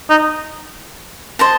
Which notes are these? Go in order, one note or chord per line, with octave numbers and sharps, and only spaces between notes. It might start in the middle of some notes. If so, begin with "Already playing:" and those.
D#4
C5 D#5 A5